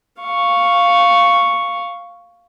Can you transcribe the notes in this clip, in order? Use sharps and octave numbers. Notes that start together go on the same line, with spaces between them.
F5 C#6